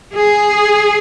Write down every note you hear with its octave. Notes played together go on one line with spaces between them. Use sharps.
G#4